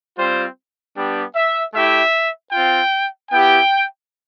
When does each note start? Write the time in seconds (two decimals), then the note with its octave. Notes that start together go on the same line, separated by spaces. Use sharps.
0.18 G3 C4 F4 C5
0.96 G3 B3 D4 G4
1.35 E5
1.74 A3 E4 G4 E5
2.52 C4 F4 G5
3.30 B3 E4 G4 G5